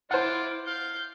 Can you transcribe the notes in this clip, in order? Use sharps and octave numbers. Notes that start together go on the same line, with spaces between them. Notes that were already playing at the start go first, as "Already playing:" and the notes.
E4 F4 C5 F#5 D6
F5 G6